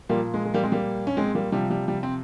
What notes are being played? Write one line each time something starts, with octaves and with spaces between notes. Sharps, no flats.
A#2 F3 G3 A#3
G#3
G#3
G3 A#3
G#3 C4
G3 A#3
C#4
G#3 C4
G3 A#3
C3 F3 G3
G3
G3
C4